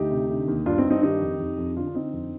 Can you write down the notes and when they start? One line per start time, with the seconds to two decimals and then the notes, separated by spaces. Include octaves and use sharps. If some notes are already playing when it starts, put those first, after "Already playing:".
Already playing: D2 D#4 G4
0.11 C3
0.29 D3
0.48 D#2
0.66 G2 D4 F4
0.78 C4 D#4
0.85 G2
0.90 C4 D#4
1.03 D#3 D#4 G4
1.22 F2
1.40 F2
1.58 F2
1.76 D3 D4 F4
1.87 D4
1.95 D3 C4 D#4
2.13 F2